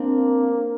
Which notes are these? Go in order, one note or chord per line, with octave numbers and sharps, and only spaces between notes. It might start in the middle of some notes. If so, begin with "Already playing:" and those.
Already playing: A#3 C4 D4